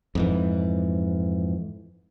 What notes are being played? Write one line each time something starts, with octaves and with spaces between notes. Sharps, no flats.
F2 G#2 E3